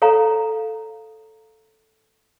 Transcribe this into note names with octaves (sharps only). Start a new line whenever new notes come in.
A4 C#5 F5 A#5